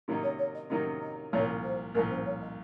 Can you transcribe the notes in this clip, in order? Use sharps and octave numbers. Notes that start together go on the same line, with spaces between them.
C3 D#3 F#3 A#3 D#4
C#5
C#5
D#5
C3 D#3 F#3 A#3 D#4 D#5
D#5
C2 A#2 F3 C#5
C5
C2 A#2 F3 A#4
C5
C#5
D#5